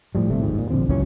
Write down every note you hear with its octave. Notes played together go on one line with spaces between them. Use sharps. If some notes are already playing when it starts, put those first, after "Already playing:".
A2 F3 G3
G1 C3 A3
D#2 G#2
A#2
A#1 D3 F3 C4
C#2 F#2 E3 C#4